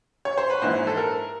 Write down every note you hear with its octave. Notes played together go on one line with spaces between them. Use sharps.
C#5
C5
B4
A#1 G#2 E3 C5
A4
A#4